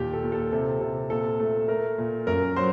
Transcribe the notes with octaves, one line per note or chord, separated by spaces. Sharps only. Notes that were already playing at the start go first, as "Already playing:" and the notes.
Already playing: D#2 A#2 G4
A4
A#2
A4
C3 A4
C3
A#2 A4
A3
A3 A#4
A#2
F#2 A#4
F#3 C5